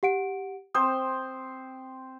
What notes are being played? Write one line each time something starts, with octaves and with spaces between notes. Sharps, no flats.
G4 F#5 D7
C4 C5 D#6